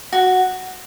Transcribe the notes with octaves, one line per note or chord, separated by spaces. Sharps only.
F#4